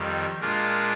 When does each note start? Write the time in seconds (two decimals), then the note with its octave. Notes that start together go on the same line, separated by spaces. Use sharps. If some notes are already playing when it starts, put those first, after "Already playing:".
Already playing: F2 D#3 G3
0.40 A#2 G#3 D4 F4 A#4